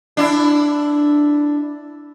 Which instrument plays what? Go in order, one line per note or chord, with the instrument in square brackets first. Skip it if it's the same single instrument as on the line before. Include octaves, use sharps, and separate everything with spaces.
[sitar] D4 E4